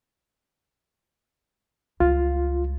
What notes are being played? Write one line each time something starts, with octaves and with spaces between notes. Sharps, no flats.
C#2 G3 F4